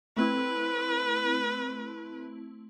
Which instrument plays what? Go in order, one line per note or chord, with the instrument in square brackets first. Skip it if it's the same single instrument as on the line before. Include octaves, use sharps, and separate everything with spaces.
[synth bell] A3 C4 E4 [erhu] B4